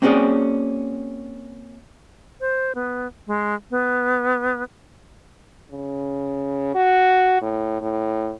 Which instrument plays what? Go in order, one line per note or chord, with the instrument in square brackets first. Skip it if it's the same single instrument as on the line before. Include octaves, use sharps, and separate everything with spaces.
[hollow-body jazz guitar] A#3 C4 C#4 F#4 G#4 D5
[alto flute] C5
B3
G#3
B3
[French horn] C#3
F#4
A2
A2